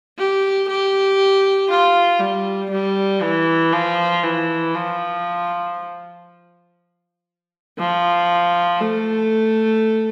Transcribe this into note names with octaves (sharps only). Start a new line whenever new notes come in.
G4
G4
F4
G3
G3
E3
F3
E3
F3
F3
A3